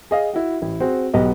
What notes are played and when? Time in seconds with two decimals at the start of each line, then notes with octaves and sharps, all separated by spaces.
0.11 G#4 D#5 F5
0.34 E4 F#4
0.62 A1 E4
0.80 C4 F#4 G#4 C5
1.14 B1 B3 G4 D#5